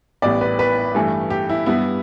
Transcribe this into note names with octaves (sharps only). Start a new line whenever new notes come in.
A1 A2 G3 B3 D5
B4
B4
G2 E3 A3
G4
E4
G2 G3 B3 E4